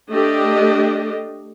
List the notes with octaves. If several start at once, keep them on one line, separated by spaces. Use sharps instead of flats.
A3 D4 G4 D#5